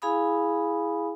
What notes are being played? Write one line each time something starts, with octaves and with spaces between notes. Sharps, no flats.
E4 G#4 F5 G#5 B5 D#6